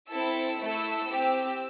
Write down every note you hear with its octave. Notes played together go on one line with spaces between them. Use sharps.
C4 E4 A4 E6
A3 E4 A4
C4 G4